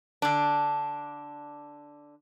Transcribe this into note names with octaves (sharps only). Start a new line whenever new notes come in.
D3 D4